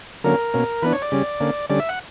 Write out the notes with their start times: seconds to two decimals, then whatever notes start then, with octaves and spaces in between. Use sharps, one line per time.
0.24 D3 F#3 A#3 C#4 A#4
0.54 B2 A#3 C#4
0.82 E3 B3 D4 B4
0.93 C#5
1.02 D5
1.12 C#3 G3 C#4
1.40 D3 A#3 C#4
1.70 D3 G3 C#4 D5
1.80 E5
1.89 F#5